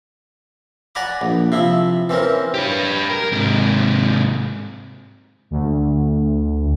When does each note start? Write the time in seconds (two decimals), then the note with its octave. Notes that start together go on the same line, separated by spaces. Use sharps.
0.95 D5 F#5 G#5 A#5 B5 D6
1.21 A#1
1.52 C3 F3 E4
2.09 E3 C4 C#4 A#4
2.54 G4 B4
3.10 A#4
3.32 G#2 C3
5.51 D2